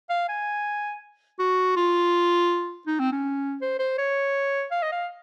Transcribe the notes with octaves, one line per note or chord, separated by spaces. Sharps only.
F5
G#5
F#4
F4
D#4
C4
C#4
C5
C5
C#5
F5
D#5
F5